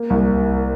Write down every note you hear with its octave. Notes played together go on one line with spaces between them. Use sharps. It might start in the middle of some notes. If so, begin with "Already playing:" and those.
Already playing: A#3
C2